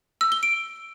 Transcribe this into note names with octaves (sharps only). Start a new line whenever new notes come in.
E6
G7
D7